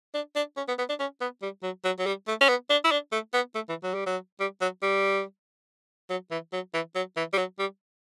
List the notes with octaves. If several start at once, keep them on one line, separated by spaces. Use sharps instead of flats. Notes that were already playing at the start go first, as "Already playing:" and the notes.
D4
D4
C#4
B3
B3
D4
C#4
B3
G3
F#3
F#3
F#3
G3
A3
C#4
B3
D4
E4
D4
A3
B3
A3
E3
F#3
G3
F#3
G3
F#3
G3
F#3
E3
F#3
E3
F#3
E3
G3
F#3
G3